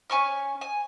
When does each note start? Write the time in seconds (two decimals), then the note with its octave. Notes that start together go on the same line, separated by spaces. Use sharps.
0.10 C#4 G#5 C#6 F6
0.61 G#5